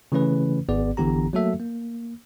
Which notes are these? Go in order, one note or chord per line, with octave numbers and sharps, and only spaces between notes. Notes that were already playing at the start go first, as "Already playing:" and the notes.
C#3 E3 A3 C#4 B4
G#1 B3 G#4 D5
A1 D3 E3 B3 G4 A#5
F#3 A3 A#3 F#4 A4 E5
A#3